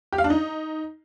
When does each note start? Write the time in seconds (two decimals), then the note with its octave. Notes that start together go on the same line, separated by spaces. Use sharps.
0.12 G4
0.18 F5
0.24 D4
0.30 D#4